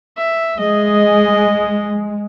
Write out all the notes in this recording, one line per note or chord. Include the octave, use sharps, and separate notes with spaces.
E5
G#3 G#4 D#5